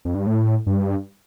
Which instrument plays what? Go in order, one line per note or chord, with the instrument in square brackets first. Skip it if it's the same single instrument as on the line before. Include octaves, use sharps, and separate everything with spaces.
[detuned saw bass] F2
G2
A2
G2